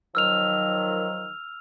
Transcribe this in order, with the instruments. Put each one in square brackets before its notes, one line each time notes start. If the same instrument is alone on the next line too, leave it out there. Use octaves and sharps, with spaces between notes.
[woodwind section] D#3 F3 F#3 [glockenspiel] E6 F6 F7